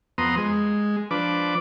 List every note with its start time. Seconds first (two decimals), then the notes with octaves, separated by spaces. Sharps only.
0.18 F2 B3 A#5 C6 D#6
0.37 G#3
1.11 F3 D4 B4 D6